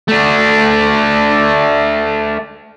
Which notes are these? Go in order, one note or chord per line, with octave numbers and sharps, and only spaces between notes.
A3 D4